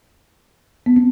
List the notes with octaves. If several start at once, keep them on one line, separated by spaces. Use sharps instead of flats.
B3
C4